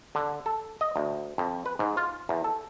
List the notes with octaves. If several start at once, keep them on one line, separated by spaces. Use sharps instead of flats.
D3
A4
D#5
D2
F2
B4
G#2
F4
E2
A4